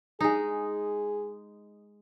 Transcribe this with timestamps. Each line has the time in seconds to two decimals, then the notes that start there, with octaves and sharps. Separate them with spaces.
0.20 G#3 D#4 G#4